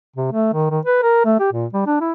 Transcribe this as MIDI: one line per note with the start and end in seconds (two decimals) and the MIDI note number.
0.16 0.29 48
0.32 0.49 57
0.53 0.69 51
0.70 0.79 51
0.85 0.99 71
1.02 1.21 70
1.25 1.36 57
1.39 1.49 67
1.52 1.66 46
1.73 1.84 55
1.86 2.00 62
2.01 2.12 64